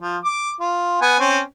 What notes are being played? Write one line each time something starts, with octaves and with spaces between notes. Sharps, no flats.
F3
D6
F4
B3 F#5 G#5
C4 C#4